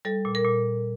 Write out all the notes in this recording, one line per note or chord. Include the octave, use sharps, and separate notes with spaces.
G3 A4
A#2
A#4
A#2